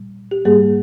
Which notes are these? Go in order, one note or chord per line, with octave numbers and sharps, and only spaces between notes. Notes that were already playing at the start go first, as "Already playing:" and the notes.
Already playing: A#2 G3
G4
G#2 G3 A#3 G#4